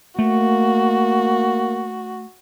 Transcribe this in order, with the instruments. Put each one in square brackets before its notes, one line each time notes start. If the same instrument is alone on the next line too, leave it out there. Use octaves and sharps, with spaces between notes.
[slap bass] A3 [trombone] A#3 [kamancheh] F#4